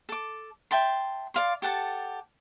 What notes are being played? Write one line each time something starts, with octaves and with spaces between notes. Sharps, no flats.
A4 D6
E5 G5 A5 C6
D5 F5 C6
G4 A4 F#5 A5